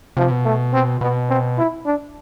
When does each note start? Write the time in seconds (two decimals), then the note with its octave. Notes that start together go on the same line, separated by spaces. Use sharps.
0.17 C3 F3
0.31 B2
0.45 A3
0.73 C4
1.01 B2 B3
1.30 C4
1.58 E4
1.86 D4